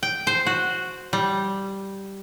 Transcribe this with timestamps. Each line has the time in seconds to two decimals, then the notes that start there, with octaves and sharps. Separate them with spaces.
0.03 G5
0.27 C5
0.46 F#4
1.13 G3